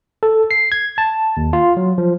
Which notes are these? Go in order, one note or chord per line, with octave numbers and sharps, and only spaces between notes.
A4
C7
G#6
A5
D#2
F4
F#3
F3